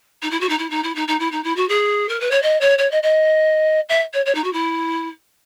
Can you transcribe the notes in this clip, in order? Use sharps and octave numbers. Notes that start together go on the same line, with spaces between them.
D#4
E4
F#4
D#4
E4
D#4
E4
D#4
D#4
E4
D#4
E4
F#4
G#4
A#4
B4
C#5
D#5
C#5
C#5
D#5
D#5
E5
C#5
C#5
D#4
F#4
E4